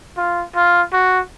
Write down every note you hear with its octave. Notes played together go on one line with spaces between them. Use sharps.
F4
F4
F#4